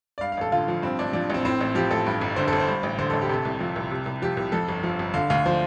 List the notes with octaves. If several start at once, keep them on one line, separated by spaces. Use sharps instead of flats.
D5
G2 F5
F5
A1 A4
D3 F4
F3
G2 C4
A1 D4
F3 D4
A1 C4
A2 C4
A1
F3 G4
A1 A4
G2
G1
D3 C5
A4
G1
C5
G2
A1
D3 C5
A1 A4
G4
C3 A4
C2
F3
C2
C3
C2
F3 G4
C2
F2 A4
G1
F3
G1
D3 F5
D2 F5
F3 C5